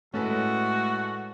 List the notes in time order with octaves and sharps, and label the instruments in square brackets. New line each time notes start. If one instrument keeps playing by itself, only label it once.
[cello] A2 G#3 [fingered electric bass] A3 [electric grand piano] C#4 A4 B4 [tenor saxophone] F#4